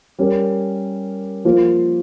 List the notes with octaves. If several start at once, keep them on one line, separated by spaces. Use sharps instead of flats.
G3 C#4 G4 A#4
F3 A#3 F4 C5 F5